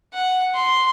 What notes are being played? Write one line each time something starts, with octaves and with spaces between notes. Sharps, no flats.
F#5
C6